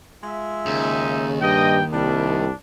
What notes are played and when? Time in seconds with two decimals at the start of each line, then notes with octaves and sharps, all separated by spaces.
0.24 G#3 F4 E5
0.66 D#2 C#3 D#4
1.41 G2 C#3 D#5 G5
1.93 C2 G3 D4